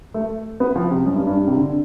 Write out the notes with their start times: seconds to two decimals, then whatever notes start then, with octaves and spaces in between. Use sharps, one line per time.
0.14 A3
0.60 B3
0.76 F3
0.91 C3
1.06 F#2
1.16 G2
1.27 G2
1.37 G2
1.47 C3
1.57 D3